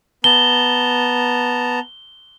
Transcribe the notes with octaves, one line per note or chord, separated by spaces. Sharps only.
B3 A5 A#5 G7